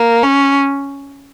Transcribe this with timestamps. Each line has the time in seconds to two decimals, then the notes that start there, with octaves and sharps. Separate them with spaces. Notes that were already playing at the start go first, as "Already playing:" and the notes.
Already playing: A#3
0.23 C#4